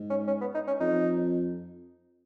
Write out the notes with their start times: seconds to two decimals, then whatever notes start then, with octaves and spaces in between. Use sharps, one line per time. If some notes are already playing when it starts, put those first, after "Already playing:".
Already playing: G#2
0.10 C#4
0.27 C#4
0.41 B3
0.55 D#4
0.67 C#4
0.80 F2 D#4